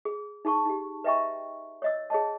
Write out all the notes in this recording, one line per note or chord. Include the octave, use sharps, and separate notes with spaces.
G#4
D#4 G#4 A5 C#6
D#4 G4
B4 D#5 E5 G5 A#5 C#6
C#5 D#5 E6
G#4 C#5 D#5 A5